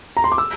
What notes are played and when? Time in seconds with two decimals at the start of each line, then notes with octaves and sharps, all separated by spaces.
0.17 A#5
0.24 C6
0.32 D6
0.38 E6